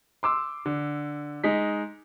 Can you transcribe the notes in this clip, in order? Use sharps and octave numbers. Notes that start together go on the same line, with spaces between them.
C6 D6 E6
D3
G#3 D#4 B6